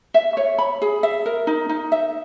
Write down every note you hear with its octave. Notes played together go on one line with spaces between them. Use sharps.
E5
C#5
B5
G#4
E5
A#4
D#4
D#4
E5